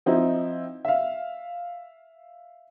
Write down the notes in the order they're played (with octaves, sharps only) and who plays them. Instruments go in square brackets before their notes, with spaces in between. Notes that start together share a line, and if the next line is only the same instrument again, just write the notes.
[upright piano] F3 C4 D#4 E4
E5 F5